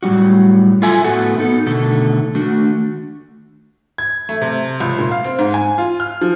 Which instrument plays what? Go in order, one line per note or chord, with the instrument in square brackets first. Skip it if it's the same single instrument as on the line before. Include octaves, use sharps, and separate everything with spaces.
[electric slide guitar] A2 F#3 G3 D#4 F#4
F4 A4 E5 G#5
A2 A3 B3 F#4 A4
B3 D#4 A4
B2 D3 D#3 A3 A4
D#3 A3 D4 F#4
[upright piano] G#6
A3
C3
C#2
A#2
F5
C4
G#2
G#5
F4
F6
F3